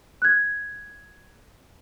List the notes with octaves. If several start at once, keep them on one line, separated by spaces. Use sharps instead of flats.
F#6 G#6